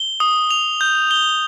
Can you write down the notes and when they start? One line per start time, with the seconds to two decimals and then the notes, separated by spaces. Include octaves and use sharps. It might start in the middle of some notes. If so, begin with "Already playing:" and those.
Already playing: G7
0.20 D#6
0.51 F7
0.81 G6
1.11 G7